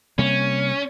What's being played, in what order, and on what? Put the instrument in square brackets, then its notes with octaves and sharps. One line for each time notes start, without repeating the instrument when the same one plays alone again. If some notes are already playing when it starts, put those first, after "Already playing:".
[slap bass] C3 G3 A#3 [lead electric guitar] C#4